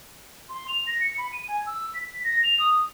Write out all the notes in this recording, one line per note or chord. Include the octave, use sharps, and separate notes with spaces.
C6
F7
A#6
C#7
B5
D#7
G#5
E6
B6
A#6
F7
D#6